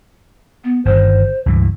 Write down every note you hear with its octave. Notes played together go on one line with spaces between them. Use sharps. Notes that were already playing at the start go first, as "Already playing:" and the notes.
B3
G1 G2 D#3 C5
C#2 G2 E3